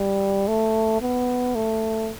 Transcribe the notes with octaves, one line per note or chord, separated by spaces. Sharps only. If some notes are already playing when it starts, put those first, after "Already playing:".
Already playing: G3
A3
B3
A3